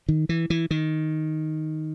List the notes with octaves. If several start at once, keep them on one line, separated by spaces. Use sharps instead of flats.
D#3
E3
E3
D#3